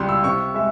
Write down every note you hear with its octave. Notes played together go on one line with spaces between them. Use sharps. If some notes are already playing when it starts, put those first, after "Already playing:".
Already playing: C#2 C3 G3 C6
E6
C3 C#6
G#3 E5